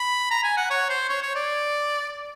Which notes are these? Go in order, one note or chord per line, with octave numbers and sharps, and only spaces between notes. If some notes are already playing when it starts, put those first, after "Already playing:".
Already playing: B5
A#5
G#5
F#5
C#5
C5
C#5
C#5
D5